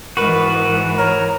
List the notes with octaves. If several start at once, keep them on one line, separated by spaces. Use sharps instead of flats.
G#2 E3 F#4 A#4 B4
A#4 C#5